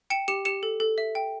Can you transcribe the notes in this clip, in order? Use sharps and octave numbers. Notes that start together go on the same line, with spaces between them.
G5 C#7 E7
G4 C#7 E7
G4 C#7 E7
A4
A4
E5
G5